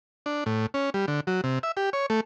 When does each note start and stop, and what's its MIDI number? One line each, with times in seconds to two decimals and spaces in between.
0.26 0.44 62
0.46 0.66 45
0.74 0.90 61
0.94 1.06 55
1.08 1.20 50
1.27 1.41 54
1.44 1.59 48
1.63 1.72 76
1.77 1.90 67
1.93 2.06 73
2.10 2.20 57